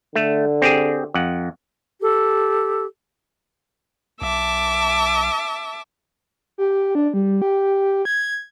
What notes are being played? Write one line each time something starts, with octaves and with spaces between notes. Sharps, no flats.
D3 A3
C4 G4 G#4
F2 F#5
G4 A4
B1 E5 A5 D6
G4
D4
G3
G4
G#6